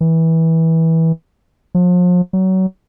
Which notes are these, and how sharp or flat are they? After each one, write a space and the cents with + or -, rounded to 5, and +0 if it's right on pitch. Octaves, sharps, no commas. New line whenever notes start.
E3 -20
F3 +40
F#3 +25